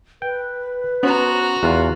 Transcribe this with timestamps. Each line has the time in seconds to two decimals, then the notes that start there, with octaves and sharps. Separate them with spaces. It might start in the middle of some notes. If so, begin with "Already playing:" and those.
0.22 B4 G5
1.03 B3 C#4 F#4 C5 A#5
1.63 E2 F4 F5 F#6